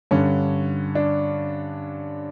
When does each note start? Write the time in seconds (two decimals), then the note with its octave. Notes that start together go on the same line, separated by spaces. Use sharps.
0.11 G2 D3 C#4
0.95 D4